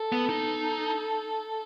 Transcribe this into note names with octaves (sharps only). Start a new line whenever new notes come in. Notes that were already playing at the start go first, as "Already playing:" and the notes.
Already playing: A4
B3
D#4